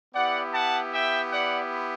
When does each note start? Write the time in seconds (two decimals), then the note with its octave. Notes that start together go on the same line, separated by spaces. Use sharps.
0.14 B3 E4 G4 D5 F#5
0.53 F#5 A5
0.93 E5 G5
1.32 D5 F#5